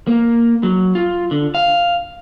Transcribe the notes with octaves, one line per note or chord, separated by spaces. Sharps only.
A#3
F#3
F4
D3
F5